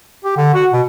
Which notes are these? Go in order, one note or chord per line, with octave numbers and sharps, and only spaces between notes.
G4
D3
F#4
B2